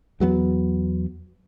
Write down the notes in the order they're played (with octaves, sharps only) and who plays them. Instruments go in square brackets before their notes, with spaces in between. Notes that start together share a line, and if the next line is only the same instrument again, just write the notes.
[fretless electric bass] E2 F#3 G#3 B3